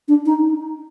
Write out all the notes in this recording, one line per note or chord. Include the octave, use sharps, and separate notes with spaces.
D4
D#4